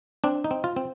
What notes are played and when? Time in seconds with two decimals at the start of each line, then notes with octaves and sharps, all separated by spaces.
0.24 C4 D4
0.44 D#4
0.51 C4
0.64 F4
0.76 C4